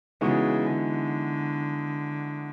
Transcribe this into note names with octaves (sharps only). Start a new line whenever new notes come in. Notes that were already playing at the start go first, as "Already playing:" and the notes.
C#3 E3 G#3 B3 D#4 F#4
D3